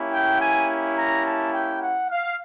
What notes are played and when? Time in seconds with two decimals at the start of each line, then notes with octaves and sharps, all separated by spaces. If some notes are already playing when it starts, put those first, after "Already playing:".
Already playing: A#3 C#4 E4 G4
0.12 G5
0.40 G#5
0.97 A#5
1.25 A5
1.53 G5
1.80 F#5
2.09 F5